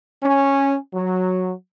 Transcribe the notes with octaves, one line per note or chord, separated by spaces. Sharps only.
C#4
F#3